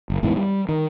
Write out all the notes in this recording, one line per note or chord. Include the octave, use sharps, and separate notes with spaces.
F#1
A1 E2 G#2 E3
G3
D#3